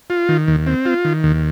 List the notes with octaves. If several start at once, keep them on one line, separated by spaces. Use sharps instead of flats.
F4
D#3
D#2
C4
F4
D#3
D#2